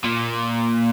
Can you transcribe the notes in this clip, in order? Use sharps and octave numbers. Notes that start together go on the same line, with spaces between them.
A#2